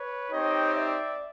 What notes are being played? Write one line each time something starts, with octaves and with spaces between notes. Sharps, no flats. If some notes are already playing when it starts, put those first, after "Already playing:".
Already playing: B4 C#5
C4 D#4 G4 C#5 D#5
D5 E5